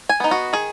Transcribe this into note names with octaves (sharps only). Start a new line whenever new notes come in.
G#5
B3 D#4
F#4
D#3 G#4